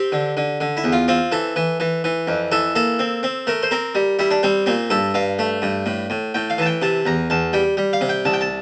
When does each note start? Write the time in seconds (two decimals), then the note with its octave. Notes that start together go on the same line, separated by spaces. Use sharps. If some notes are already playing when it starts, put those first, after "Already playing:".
Already playing: C4 G4
0.12 D3
0.37 D3
0.61 D3
0.77 E4
0.84 E2
0.92 F4
1.08 C4 F4
1.32 E3 A4
1.56 E3
1.80 E3
2.04 E3
2.27 F2
2.52 E3 A4
2.75 A#3 A4
2.99 C4
3.23 C4
3.47 A3 A#4
3.63 C5
3.71 C4 A#4
3.95 G3
4.19 G3 E4
4.31 D4
4.43 G3 C4
4.66 A#2 C4
4.90 G2 A4
5.14 G2 F5
5.39 A3
5.62 G2
5.86 A2
6.10 A2
6.34 A2 G5
6.50 F5
6.58 E3 A5
6.66 G5
6.82 C3 A5
7.06 E2 A#5
7.30 E2 A5
7.53 G3 G5
7.77 G3
7.93 F5
8.01 C3
8.09 G5
8.25 C2 A5
8.33 G5
8.41 A5